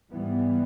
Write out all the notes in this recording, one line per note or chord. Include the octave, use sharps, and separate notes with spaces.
G#2 E3 G3 B3